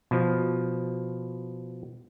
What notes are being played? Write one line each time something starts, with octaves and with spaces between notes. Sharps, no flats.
B2 F3